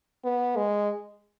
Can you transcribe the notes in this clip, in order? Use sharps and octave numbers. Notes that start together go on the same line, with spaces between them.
B3
G#3